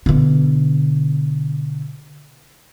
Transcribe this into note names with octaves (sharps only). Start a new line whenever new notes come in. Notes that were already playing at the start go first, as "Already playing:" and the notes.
B2 D3